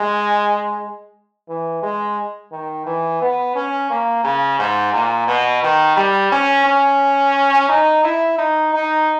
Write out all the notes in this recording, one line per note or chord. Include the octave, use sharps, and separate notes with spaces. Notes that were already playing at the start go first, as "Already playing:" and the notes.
Already playing: G#3
E3
G#3
D#3
E3
B3
C#4
A#3
C#3
G#2
A#2
B2
D#3
G3
C#4
C#4
D#4
E4
D#4
D#4